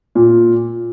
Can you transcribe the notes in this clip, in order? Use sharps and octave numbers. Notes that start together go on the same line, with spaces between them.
A#2